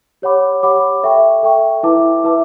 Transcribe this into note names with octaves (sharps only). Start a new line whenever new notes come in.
G4 C#5 F#5 B5 D6
G4 C#5 F#5 B5 D6
A4 E5 G5 C#6
A4 E5 G5 C#6
E4 B4 E5 A5 D6
E4 B4 E5 A5 D6